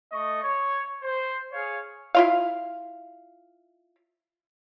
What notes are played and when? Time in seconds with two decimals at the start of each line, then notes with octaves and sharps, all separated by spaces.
0.11 A3 D#5 C#6
0.42 C#5
1.02 C5
1.53 G#4 C#5 F5
2.15 E4 F4 F5